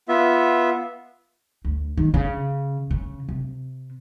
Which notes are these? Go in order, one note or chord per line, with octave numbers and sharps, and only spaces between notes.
B3 F4 E5
D2
D#3
C#3
C#3
C3